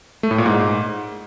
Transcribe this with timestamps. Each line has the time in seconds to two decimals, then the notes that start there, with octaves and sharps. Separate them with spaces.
0.23 A3
0.31 A2
0.38 A#2
0.46 G#2